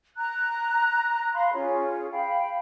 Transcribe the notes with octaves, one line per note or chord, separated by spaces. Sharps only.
A#5 F#6
F5 B5 C6
C#4 F4 G#4 C#5
F5 G5 B5